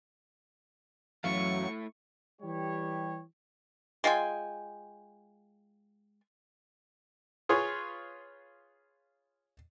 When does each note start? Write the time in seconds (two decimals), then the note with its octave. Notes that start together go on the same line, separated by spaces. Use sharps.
1.24 F#2 E3 F#3 A3 E4 F5 C#6
2.42 E3 G3 G4 C#5
4.04 G#3 F4 G5 G#5
7.49 F4 G#4 B4 C#5